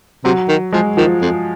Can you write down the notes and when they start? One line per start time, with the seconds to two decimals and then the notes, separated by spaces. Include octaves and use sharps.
0.24 C3 F#3
0.48 D#3
0.73 F3 G#3
0.97 D#3 F3
1.22 F2